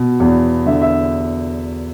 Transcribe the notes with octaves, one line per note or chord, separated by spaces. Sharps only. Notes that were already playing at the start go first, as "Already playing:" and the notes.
Already playing: B2
E2
D3 E5
E5